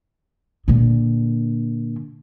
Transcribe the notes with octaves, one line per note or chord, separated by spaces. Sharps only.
A#2 D3